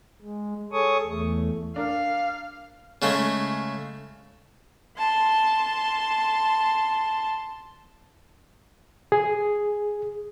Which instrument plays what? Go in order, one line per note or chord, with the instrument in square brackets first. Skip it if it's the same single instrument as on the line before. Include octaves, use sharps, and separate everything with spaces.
[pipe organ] G#3
G#4 A4 C#5 C#6 D#6
E2 A3
[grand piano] D4 A#4 [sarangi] F5
[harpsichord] C#3 G#3 A3
[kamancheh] A5 C6
[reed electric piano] G#4